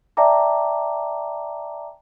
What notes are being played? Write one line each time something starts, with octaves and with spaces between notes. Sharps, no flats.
D5 E5 G5 A5 A#5 D6